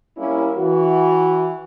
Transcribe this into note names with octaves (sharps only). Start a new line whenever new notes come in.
G3 A#3 C#4 E4
E3 F#4